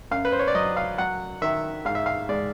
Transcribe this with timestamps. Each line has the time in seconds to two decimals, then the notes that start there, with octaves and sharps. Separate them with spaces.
0.11 F#2 F5
0.25 B4
0.32 C5
0.39 C#5
0.48 D5
0.55 F#3 D#5
0.77 F5
0.98 F#3 F#5
1.42 D#3 E5
1.85 G#2 F5
1.95 E5
2.06 F5
2.29 G#3 D5